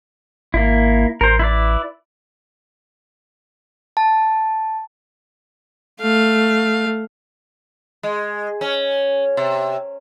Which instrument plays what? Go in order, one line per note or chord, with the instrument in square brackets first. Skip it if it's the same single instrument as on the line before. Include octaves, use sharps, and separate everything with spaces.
[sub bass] G#1 [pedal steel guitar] A#3 E4
[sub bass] A1 [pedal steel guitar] A#4 C5
[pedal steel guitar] E4 B4 D5
[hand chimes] A5
[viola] A3 F5
[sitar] G#3
C#4
C3